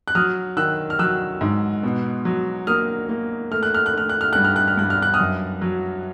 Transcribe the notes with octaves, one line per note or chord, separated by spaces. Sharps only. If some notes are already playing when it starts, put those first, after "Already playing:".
F#6
F#3 D#6 F6
D#3 E6 F#6
F6
F#3 E6 F#6
G#2
B2
F#3
A#3 D#6 F6
A#3
A3 F6
F#6
F6
F#6
A3 F6
F#6
F6
G2 F#6
F6
F#6
F6
G2 F#6
F6
F#6
D#6 F6
F#2
F#3